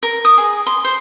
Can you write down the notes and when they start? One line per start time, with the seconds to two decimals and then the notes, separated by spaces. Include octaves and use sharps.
0.03 A#4
0.25 D#6
0.38 G#4
0.67 C6
0.85 C5